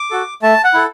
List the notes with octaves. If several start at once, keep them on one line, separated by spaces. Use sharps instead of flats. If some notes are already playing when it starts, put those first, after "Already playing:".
Already playing: D6
F#4 A4
A3 A5
F#5
E4 A4